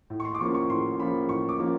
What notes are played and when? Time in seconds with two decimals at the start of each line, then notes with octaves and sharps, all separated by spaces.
0.10 A2
0.20 C#6
0.25 C6
0.35 D6
0.40 F3 A#3 C#4 C#6
0.55 C#6
0.69 A2 C6
0.99 F3 A#3 C#4 B5
1.29 A2 C#6
1.49 D6
1.59 F3 A#3 C#4